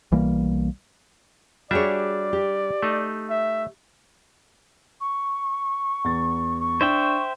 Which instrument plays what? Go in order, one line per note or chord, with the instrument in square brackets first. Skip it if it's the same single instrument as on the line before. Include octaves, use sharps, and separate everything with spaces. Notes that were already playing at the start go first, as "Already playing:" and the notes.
[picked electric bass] B1 E3 G3 A#3
[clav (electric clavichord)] G3 D4 E5 [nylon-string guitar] F#4 G#4 C#5 [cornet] D5
[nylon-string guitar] G4
[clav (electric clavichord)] A3 D#4
[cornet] E5
[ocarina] C#6
[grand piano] E2 A6
[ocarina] C#6
[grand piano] D4 [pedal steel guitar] C5 E5 G5